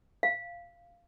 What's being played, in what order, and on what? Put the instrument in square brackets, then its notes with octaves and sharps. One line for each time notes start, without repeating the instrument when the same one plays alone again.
[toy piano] F5